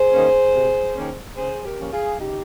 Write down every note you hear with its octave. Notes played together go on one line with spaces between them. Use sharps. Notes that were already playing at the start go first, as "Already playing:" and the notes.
Already playing: G#4 C5
D#3 A#3 C#4
C3
D#3 A#3 C#4
C#3 G#4 C5
G4 A#4
F3 A#3 C#4
F4 G#4
C#3 D#4 G4